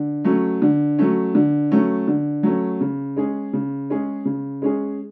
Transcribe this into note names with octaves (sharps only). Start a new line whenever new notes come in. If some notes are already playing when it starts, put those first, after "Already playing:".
Already playing: D3
F#3 A3 C#4
D3
F#3 A3 C#4
D3
F#3 A3 C#4
D3
F#3 A3 C#4
C#3
G#3 C#4 G#4
C#3
G#3 C#4 G#4
C#3
G#3 C#4 G#4